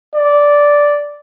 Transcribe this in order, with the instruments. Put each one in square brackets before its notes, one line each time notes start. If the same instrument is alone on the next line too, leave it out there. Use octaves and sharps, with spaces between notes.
[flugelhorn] D5